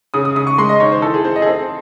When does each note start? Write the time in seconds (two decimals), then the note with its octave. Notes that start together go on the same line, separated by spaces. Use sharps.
0.14 C#3 D#6
0.25 D#6
0.36 C#3 D#6
0.47 C#6
0.58 G#3 C6
0.69 D#5
0.80 D#3 C#5
0.92 C5
1.02 E3 A4
1.14 G#4
1.24 C4 C5
1.36 D#5
1.42 G#4
1.46 C4 A4